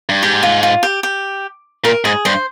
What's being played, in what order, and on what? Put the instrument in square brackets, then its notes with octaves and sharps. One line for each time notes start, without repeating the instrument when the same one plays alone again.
[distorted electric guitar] G2
[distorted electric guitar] G#2 [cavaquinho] G4
[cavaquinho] F4
F4
G4
G4
[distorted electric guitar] A#2 [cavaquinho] A#4
[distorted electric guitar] G#2 [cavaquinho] G#4
[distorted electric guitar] G2 [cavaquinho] C5